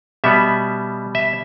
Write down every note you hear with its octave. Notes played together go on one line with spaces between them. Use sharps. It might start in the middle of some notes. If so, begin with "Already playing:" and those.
B2 G3 B3 E5
E5